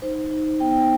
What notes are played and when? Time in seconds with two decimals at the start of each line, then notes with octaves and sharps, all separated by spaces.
0.02 D#4 C5
0.31 D#4
0.60 B3 G5